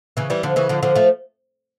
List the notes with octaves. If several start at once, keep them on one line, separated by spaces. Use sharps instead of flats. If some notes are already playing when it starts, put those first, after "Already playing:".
C#3 E3
E3 G3
D3 F3
C#3 E3
D3 F3
D3 F3
F3 A3